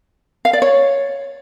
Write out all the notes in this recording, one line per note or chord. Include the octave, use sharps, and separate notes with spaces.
F5
D5
C#5